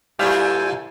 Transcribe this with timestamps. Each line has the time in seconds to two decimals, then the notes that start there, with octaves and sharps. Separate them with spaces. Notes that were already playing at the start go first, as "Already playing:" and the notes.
0.19 A#2 G3 E4 A4 C5 E5 F5 G#5